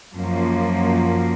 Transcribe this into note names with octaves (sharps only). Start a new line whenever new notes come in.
F#2 F3 A#3